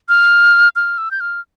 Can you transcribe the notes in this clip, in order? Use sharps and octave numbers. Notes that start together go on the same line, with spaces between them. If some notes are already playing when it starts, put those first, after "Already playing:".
F6
F6
E6
G6
F6